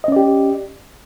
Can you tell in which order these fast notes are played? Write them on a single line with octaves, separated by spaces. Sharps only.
D#5 C#4 D5 G4